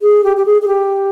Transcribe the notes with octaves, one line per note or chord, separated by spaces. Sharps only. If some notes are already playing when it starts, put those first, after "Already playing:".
G#4
G4
G4
G#4
G#4
G4